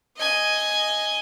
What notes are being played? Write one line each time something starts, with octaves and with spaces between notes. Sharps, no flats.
D#5 G#5